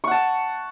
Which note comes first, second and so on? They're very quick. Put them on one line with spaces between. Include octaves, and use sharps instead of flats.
C#6 F#5 A5